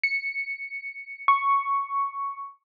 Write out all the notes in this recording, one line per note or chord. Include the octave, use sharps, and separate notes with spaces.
C#7
C#6